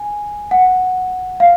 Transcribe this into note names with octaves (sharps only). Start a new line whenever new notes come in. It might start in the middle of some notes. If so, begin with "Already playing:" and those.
Already playing: G#5
F#5
F5